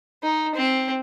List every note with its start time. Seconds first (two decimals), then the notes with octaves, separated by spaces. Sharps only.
0.23 D#4
0.55 C4